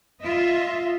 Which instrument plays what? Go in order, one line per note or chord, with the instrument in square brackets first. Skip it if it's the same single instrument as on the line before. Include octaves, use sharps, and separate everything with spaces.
[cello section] F4 D#5 E5